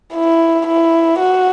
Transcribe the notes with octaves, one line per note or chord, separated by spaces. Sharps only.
E4
E4
F#4